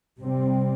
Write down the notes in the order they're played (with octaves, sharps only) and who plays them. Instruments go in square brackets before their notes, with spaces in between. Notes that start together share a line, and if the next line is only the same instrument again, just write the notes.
[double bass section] C3 G3 C4